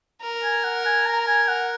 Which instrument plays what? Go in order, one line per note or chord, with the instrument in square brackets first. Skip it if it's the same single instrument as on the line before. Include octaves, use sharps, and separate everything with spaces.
[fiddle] A#4
[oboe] G#5
F#5
G#5
A#5
A#5
G#5
F#5